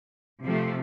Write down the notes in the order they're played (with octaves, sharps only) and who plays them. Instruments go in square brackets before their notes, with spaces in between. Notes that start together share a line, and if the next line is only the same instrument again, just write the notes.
[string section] C3 F3 A3